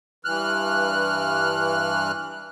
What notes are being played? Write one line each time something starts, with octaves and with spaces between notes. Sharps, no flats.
G2 E3 F6 F#6